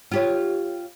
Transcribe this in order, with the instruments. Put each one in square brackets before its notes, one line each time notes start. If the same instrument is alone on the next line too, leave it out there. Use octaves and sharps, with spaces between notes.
[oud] F4 G4 C#5